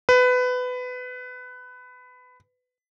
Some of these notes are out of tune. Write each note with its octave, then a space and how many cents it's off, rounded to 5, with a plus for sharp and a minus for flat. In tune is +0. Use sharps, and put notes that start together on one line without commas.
B4 +20